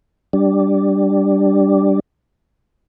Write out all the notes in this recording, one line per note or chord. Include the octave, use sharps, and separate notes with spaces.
G3 D4